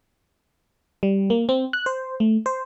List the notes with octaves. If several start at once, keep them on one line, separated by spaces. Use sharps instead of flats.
G3
A#3
C4
F#6
C5
A3
C5